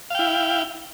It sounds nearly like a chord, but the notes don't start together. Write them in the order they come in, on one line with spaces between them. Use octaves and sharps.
F5 G5 E4